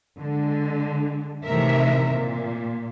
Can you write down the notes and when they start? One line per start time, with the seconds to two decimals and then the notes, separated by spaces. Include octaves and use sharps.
0.18 D3 G#3
1.45 A2 C3 D#3 E3 A#4 E5
2.12 A#2